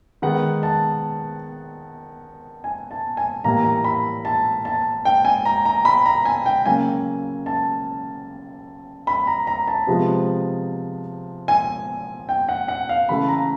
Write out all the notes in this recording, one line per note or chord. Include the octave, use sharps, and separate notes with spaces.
D#3 G#3 B3 F#5
A5
G#5
A5
G#5
A2 E3 G3 A#3 A#5
A#5
B5
A5
A5
G5
G#5
A#5
A#5
B5
A#5
G#5
G5
C#3 F#3 A#3 G#5
A5
B5
A#5
A#5
A5
C3 F3 G#3 B3
G#5
G5
F#5
F#5
F5
C#3 E3 A3 B5
A#5